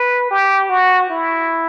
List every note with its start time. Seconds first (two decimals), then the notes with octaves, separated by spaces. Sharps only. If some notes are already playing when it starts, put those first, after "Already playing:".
Already playing: B4
0.31 G4
0.69 F#4
1.10 E4